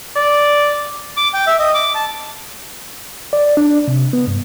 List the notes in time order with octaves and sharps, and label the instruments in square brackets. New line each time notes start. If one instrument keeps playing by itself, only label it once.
[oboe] D5
[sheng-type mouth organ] D6
G5
E5
D#5
D6
A5
[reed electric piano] D5
D4
C3
B3
G2